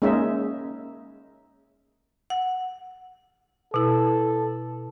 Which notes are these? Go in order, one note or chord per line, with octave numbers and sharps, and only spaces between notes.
G#3 A#3 C#4 D#4 E5
F#5
B2 E4 A4